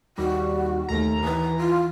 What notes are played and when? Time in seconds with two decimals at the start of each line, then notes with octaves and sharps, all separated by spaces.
0.18 D#2 G3 F#4
0.89 D#2 A3 A#5
1.24 E3 B4
1.58 F4